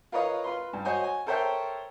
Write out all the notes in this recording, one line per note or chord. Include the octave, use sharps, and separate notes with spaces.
F4 A#4 B4 C#5 D#5 F5
F4 B4 C6
G2
F#4 C5 C#5 D#5 G#5
G#5
A4 A#4 C5 C#5 E5 G5